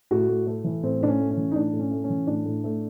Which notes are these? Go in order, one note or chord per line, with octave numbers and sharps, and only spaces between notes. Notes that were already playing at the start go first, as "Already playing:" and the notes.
A2 F#4
A2
A3
E3
A2 C4
A2 D4
C#4
A3
C#4
E3
D#4
A2 D4
A2
C#4
A3
C#4
E3
A2 D4
A2
A3